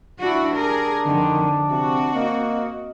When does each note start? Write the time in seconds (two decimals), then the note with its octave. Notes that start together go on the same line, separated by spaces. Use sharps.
0.19 D4 E4 F#4
0.55 D4 G4 G#4 A#4
1.06 F2 D3 D#3
1.69 C3 C4 F#4
2.15 A#3 D#5